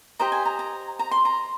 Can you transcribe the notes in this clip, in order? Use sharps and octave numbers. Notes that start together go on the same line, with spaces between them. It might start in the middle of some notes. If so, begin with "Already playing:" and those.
G4 C5 D#5 A#5
G#5
A#5
A#5
A#5
C6
A#5